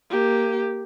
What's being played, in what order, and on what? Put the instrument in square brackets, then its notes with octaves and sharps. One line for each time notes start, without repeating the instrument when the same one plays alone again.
[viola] A#3 G4